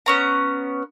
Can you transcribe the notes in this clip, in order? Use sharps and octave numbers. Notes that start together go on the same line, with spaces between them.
B3 C#4 A#5